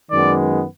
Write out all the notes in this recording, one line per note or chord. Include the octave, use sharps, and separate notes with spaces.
F#2 D#3 G#3 B3 D5